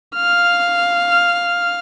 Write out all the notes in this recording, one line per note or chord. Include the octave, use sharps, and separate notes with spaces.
F5 F6